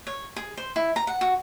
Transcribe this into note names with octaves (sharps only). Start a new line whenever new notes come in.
C#5
G#4
C5
E4
A#5
F#5
F#4